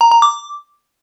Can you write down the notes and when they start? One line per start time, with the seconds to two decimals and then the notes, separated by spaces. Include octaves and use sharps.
0.01 A#5
0.11 A#5
0.22 D6